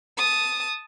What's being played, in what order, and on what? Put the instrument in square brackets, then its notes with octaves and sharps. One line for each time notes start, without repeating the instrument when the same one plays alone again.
[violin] A5 D#6